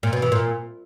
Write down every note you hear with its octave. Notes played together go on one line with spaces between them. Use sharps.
A#2
B2
E3
A#2